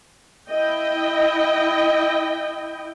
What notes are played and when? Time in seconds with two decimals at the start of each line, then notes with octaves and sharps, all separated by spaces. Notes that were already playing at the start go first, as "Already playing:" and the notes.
0.50 E4 D#5 G5